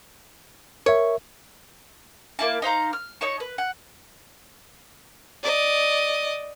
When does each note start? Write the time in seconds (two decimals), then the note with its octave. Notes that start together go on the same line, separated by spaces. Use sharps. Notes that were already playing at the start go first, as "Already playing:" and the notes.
0.86 A#4 C#5 E5
2.39 A#3 E4 A5
2.62 D#4 C5 F5 A#5
2.93 F6
3.21 D#4 C#5 A5 C#6
3.40 B4
3.58 F#5
5.43 D5 D#5